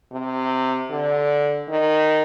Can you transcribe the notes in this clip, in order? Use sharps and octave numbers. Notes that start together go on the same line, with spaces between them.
C3
D3
D#3